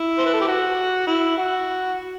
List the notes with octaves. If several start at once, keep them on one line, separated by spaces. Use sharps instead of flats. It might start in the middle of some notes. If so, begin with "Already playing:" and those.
Already playing: E4
C5
B4
A4
G4
F#4
E4
F#4